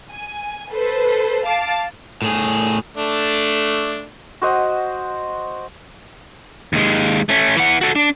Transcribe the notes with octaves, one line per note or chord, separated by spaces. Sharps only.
G#5
A4 B4 C5
F5 A5 D6
A2 G#4
A3 D4
F#4 C5 D#5 F#5
D#2 G#3
A3 C#4
E3 F#5
F#4 A4
D4